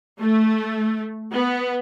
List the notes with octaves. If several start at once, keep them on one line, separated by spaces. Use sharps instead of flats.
A3
B3